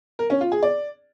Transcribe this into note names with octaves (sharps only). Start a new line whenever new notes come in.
A#4
C#4
F4
G#4
D5